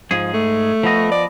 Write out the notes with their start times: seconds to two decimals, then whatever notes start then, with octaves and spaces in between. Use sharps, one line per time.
0.11 G#2 F3 G#4
0.33 A3
0.83 F3 B3 D#5
1.11 D5